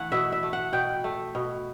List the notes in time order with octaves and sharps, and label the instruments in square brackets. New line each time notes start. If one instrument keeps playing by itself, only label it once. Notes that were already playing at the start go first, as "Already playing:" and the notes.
Already playing: [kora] E3 A3 F#5
B2 E5
E5
A3
F#5
B2 G5
A3
B2